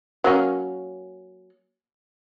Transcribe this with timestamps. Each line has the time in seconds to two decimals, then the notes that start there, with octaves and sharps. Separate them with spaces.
0.24 F#3 A#3 C#4